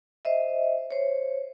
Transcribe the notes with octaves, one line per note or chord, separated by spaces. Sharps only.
C5 D#5 E5
C5 C#5